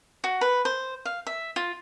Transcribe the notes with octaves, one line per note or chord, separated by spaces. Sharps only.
F#4
B4
C5
F5
E5
F4